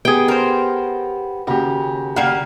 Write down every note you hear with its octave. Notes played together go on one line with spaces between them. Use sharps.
B3 G4 G#4 G5
A#4 C5
D#2 C#3 F#4 G4
G3 A#3 F5 F#5